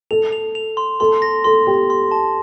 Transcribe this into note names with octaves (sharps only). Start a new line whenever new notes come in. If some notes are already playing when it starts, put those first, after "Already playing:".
A4 F7
F7
F7
C6
A4 C6
A#6
A4 C6
G4 C6
C6
A5